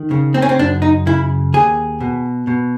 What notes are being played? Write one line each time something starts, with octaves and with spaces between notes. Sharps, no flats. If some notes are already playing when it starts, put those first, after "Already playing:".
Already playing: D#3
C#3
C4
C#4
C4
F#2 D4
D#4
C#3 E4
D#2 G#4
B2
B2